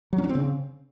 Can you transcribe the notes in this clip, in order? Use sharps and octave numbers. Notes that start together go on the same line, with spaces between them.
F#3
C#4
D4
C4
C#3